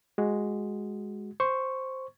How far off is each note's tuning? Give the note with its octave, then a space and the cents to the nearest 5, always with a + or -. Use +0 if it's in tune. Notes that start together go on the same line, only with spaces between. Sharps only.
G#3 +0 F#4 +0
C5 +0 C#6 +0